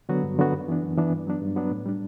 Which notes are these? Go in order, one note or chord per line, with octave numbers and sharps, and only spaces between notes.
D3 F#3 B3 F#4
G2
D3 F#3 B3 F#4
F#2
E3 B3 D4
F#2
E3 B3 D4
G2
F#3 B3 D4
G2
F#3 B3 D4
A2
G3 D4